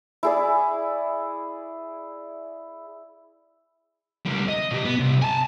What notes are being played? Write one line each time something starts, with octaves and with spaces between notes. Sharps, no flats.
E4 G#4 D5
C#2 G3
D#5
B2 G4
B3
C2
G#5 A5